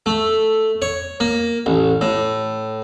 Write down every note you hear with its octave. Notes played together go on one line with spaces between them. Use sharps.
A3
C#5
A#3
A1
A2